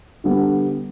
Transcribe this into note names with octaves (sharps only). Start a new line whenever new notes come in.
D3 G3 B3